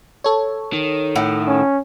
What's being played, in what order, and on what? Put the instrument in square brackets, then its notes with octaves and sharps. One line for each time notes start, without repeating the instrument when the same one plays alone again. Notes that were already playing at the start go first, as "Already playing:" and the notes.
[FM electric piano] A4 C#5
[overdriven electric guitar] D#3
[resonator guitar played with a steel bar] A2 F#5
[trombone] C#4